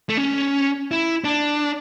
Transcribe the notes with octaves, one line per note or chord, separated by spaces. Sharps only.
A3
C#4
E4
D4